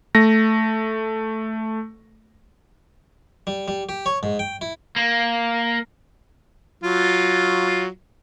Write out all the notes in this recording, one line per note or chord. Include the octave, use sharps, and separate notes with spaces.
A3 A#6
G3
G3
G4
C#5
G#2
G5
E4
A#3
F#3 F4